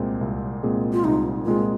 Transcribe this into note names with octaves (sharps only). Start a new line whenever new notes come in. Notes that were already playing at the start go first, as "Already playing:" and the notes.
Already playing: C2 A#2 G#3 C4 G#4
C2
A#2 G#3 C4 G#4
F4
C2 D#4
A#2 G#3 C4 F4 G#4